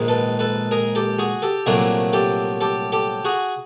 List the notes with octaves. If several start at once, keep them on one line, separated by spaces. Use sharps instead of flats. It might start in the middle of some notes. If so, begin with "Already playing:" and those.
Already playing: A#1 G#2 D#3
A4 B4
A4 B4
G#4 A#4
G4 A4
F#4 G#4
G4 A4
C2 A#2 F#3 A3 D4 G#4 A#4
G4 A4
G4 A4
G4 A4
F#4 G#4